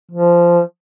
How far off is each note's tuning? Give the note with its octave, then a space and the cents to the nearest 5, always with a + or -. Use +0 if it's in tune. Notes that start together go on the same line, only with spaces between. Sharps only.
F3 -15